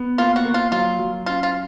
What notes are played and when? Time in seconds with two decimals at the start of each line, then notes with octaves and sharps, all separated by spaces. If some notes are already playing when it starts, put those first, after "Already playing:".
Already playing: B3
0.18 A#3 F4
0.36 F#4
0.45 A#3
0.54 F4
0.72 F#3 F4
0.99 F#3
1.26 C#4 F4
1.43 F4